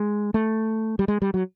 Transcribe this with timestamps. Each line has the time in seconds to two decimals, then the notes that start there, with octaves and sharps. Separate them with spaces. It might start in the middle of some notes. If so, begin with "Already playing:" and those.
Already playing: G#3
0.34 A3
0.99 G3
1.08 G#3
1.22 G3
1.34 F#3